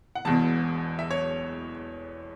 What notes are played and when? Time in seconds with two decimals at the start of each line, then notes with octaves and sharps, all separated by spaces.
0.15 F#5
0.25 E1 E2 B2 A5
0.99 E5
1.11 C#5